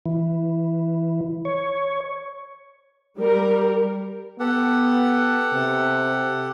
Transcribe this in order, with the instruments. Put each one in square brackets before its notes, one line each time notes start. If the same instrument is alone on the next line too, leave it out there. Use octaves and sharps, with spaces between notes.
[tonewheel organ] E3
C#5
[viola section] G3 A#4
[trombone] B3 [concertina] G4 A4 F#5
[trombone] C3